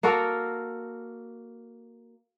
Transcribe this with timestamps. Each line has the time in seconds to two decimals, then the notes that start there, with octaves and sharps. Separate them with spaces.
0.03 A#3 F#4 A4 A#4